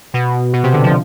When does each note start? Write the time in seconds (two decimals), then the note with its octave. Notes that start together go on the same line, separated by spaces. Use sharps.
0.14 B2
0.53 B2
0.63 C3
0.73 D3
0.83 F3